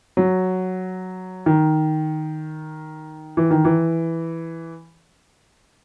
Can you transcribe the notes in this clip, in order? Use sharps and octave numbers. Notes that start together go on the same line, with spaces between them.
F#3
D#3
E3
D#3
E3